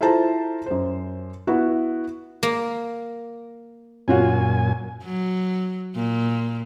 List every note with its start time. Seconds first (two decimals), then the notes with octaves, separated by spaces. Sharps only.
0.01 E4 F4 A4 C5 A5 A#5
0.66 F#2 C5
1.47 B3 E4 F#4
2.43 A#3
4.08 F#2 A#2 C#4 F4 F#4 G#5
5.03 F#3
5.96 A#2